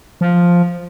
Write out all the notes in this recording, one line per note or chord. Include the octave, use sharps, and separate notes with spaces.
F3